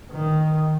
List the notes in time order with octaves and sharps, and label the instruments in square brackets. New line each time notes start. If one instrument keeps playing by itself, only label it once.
[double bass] D#3